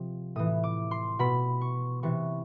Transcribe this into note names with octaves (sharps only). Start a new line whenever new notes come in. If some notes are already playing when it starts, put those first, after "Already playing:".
Already playing: C3 F3
A2 E3 D#6
D6
C6
B2 B5
C#6
C3 E3 C#6